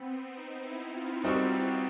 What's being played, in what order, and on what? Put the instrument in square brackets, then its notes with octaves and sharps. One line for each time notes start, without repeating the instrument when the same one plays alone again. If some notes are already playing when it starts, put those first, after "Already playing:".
Already playing: [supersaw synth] B3 C4
D#4
E4
F4
[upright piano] G3 C4 D#4 F#4 A#4